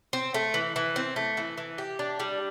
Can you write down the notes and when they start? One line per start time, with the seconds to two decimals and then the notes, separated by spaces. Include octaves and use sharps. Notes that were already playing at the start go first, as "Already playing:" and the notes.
0.13 C4
0.34 A3
0.54 E3
0.76 E3
0.96 C4
1.16 A3
1.37 E3
1.58 E3
1.78 G4
1.99 D4
2.20 G3